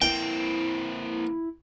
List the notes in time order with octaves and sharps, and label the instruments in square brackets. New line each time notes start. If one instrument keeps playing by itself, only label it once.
[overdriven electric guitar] A#3 C4 [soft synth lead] E4 [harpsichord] G5